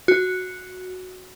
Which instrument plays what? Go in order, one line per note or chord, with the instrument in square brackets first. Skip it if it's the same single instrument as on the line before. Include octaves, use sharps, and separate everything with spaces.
[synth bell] F#4